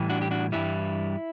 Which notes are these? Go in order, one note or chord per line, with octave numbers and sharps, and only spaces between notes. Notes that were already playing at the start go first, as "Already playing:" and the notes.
Already playing: A2 E3 G3
D4 F#4
G4
D4 F#4
G2 E3 G3 E4